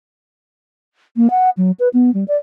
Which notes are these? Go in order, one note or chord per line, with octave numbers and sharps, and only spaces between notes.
A#3
F#5
F#3
B4
B3
G3
D5